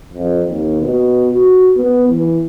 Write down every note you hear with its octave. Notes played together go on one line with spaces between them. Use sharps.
F2
D#2
B2
F#4
B3
E3